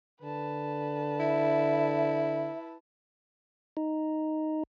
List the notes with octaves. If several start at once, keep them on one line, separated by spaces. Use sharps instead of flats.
D3 B4 A5
E4 E5
D#4